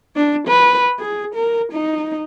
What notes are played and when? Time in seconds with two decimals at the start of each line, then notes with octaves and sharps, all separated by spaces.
0.16 D4
0.48 B4
1.00 G#4
1.35 A#4
1.72 D#4